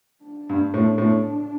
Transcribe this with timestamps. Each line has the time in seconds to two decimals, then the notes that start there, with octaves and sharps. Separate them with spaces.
0.24 D4
0.49 G2
0.74 A2
0.98 A2